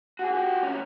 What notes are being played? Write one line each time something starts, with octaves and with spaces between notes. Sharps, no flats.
F#4 G#4
F#4 G4
C#4 E4